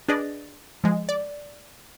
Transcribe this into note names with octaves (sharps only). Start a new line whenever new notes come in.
D4 G#4 B4 D5 D#5
F3 G#3
D5